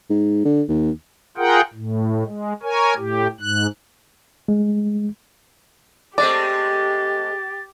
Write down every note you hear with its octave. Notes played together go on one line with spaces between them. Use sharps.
G#2
D3
D#2
F4 G#4 A#4 F#5 G5
A2
G#3
A#4 C#5 G#5
A2 G4
G#2 F#6
G#3
G#3 A3 C4 G4 D5 A6